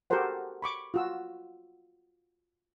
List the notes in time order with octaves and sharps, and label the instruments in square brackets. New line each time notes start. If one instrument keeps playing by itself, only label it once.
[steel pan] F#4 G4 A4 A#4 C5 F#5
B5 C#6 D6
F4 F#4 E6